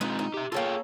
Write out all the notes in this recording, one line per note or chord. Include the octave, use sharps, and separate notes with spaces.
G#3 C4 D#4 F4 B4
D#4
G4 E5
A#3 C#4 F4 G#4 A4 G5